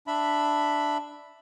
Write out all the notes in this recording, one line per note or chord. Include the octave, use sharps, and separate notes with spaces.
D4 E5 B5